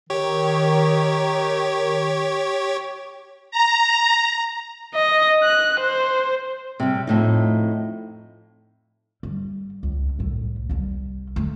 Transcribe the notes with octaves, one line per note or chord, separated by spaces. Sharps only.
D#3 G4 C#5
A#5
D#5
F#6
C5
C3 G3
F2 A2 D#4
G3
C#2
C2 A2
C2 G3
A3